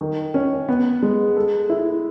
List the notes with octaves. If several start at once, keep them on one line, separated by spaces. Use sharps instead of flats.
D#3
C#4
B3
G#3
A4
E4